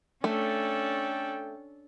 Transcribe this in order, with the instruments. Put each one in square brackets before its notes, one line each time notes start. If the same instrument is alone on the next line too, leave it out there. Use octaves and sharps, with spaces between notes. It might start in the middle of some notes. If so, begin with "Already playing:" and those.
[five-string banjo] A3 [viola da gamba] C#4 [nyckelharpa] D4 A4 [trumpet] G5